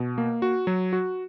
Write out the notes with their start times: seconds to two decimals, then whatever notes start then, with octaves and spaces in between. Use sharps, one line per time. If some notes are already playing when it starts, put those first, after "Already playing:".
Already playing: B2
0.18 A#3
0.42 F#4
0.67 F#3
0.93 F#4